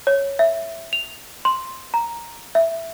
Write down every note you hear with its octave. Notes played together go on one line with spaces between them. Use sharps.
C#5
E5
F7
C6
A#5
E5